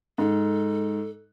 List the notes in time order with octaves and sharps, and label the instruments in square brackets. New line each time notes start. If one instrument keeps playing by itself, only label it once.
[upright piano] G#2 [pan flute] A4